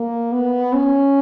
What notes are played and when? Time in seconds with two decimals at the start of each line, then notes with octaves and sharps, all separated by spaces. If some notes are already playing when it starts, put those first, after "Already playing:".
Already playing: A#3
0.33 B3
0.74 C#4